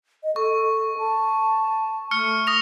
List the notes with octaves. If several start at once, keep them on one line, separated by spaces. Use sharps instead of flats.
D#5
A4 C#6
A5
A3 C#6 F6 C#7
D#6 A#6 F7